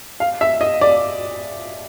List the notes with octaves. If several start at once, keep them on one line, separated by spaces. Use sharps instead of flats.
F5
E5
D#5
D5